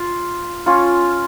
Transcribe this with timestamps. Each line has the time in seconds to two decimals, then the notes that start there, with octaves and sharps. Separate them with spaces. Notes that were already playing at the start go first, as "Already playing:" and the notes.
Already playing: F4
0.66 C#4 F4